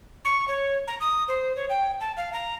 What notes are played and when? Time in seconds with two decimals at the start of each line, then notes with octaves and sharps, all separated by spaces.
0.25 C#6
0.48 C#5
0.87 A#5
1.00 D#6
1.28 C5
1.56 C#5
1.70 G5
2.00 A5
2.17 F5
2.33 A#5